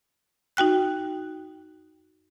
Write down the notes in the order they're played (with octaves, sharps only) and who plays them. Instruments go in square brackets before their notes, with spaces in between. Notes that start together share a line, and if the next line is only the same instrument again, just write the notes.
[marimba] D#4 F#4 G5 F#6